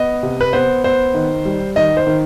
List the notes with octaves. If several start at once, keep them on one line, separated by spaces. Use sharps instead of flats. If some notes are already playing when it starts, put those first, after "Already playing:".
Already playing: B3 D#5
C3
B4
B3 C5
B3 C5
D#3
G3
D#3 D#5
C5
D#3